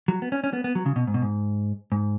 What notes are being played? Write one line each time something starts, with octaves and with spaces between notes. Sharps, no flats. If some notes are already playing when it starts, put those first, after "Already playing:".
F#3
B3
C#4
C#4
B3
B3
F#3
C#3
B2
G#2
B2
G#2
G#2